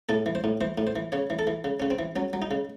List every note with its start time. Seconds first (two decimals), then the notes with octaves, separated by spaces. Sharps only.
0.09 A2 A4
0.26 E3
0.35 C5
0.44 A2
0.61 E3 C5
0.78 A2
0.87 C5
0.96 E3
1.12 C#3 C#5
1.30 E3
1.39 A4
1.47 E3
1.64 C#3
1.80 C#3 C#4
1.90 C4
1.99 E3
2.16 F#3 C#4
2.33 F#3
2.42 D#4
2.51 C#3